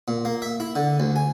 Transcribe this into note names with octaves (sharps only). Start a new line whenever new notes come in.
A#2
A#3
E5
E4
D3
D2
G#5